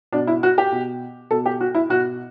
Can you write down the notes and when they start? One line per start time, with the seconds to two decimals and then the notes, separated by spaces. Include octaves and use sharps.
0.12 B2 D4
0.27 E4
0.43 F#4
0.58 G4
0.72 B2
1.31 B2 A4
1.46 G4
1.61 F#4
1.75 E4
1.89 B2 F#4